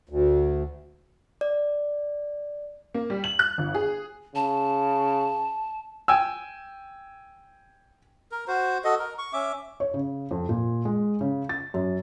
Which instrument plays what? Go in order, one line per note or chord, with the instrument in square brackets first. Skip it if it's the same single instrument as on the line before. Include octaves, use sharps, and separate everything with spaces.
[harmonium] D2
[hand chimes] D5
[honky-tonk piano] A#3
G3
F#7
F#6
G1
G#4
[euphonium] C#3 [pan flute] A5
[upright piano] G5 G#5 E6
[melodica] A#4
F#4 C5
F#4 A4 D#5
A#4
C#6
C#4 E5 D6
[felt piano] C#5
C#3
F2
A#2
G#3
C#3
A6
F#2